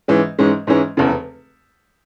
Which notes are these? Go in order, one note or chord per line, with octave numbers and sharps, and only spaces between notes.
G#2 E3 G#3 C#4
G#2 E3 G#3 C#4
G#2 E3 G#3 C#4
F1 E2 C#3